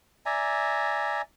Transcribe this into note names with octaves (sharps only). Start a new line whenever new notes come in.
D5 E5 G#5 A#5